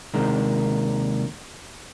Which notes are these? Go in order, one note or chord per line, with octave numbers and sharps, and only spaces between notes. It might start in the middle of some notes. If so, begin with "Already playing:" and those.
D#2 C3 D#3 G#3 D4 A#4